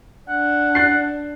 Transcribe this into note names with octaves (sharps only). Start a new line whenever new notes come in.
D4 F#5
F#6 A6 C7